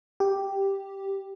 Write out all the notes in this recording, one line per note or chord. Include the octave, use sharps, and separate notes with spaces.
G4